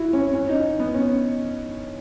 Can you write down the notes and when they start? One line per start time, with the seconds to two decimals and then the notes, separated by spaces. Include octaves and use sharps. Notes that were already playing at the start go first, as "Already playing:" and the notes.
Already playing: E4 F#4
0.13 C#4
0.34 C#4
0.49 D#4
0.80 B3
0.94 C#4